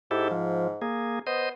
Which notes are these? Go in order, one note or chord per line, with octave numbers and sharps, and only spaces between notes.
G#2 E4 G4 A4
F3
A#3 G#4
B3 C5 D#5